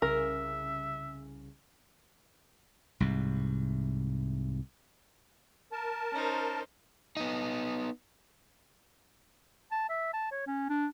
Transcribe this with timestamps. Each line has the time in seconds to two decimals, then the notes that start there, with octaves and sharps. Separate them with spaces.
0.02 C2 C#3 C#4 A#4 E5
3.00 C2 G#2 C3
5.72 A#4 A5
6.13 C#4 D#4 C5
7.17 B3 D#4
9.72 A5
9.90 E5
10.13 A5
10.32 C#5
10.47 C#4
10.70 D4